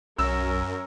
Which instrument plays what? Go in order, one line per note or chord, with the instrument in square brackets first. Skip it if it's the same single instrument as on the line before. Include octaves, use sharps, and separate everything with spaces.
[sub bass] B1 [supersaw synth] F#2 [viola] C#4 A#4 [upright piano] E6